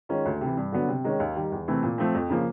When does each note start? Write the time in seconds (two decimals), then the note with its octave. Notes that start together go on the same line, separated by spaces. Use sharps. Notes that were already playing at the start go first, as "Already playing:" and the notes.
0.09 D#3 G#3 C#4 F4
0.25 D2
0.41 C3 E3
0.57 G2
0.72 D3 F#3 B3 D4
0.88 C3
1.04 D#3 G#3 C#4
1.20 D#2
1.36 D#3 G3
1.52 E2
1.68 C3 E3 A3 C4
1.83 A#2
1.98 F3 A3 C4
2.14 F2
2.30 C#3 F3 A#3